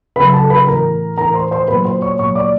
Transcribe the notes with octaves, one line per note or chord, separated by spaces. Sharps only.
C#3 F#3 B4 B5
A4 A5
B4 B5
A2 E3 A#4 A#5
A2 E3 A#4 A#5
C5 C6
C5 C6
A#2 F#3 B4 B5
C5 C6
C#5 C#6
A#2 F#3 C#5 C#6
D5 D6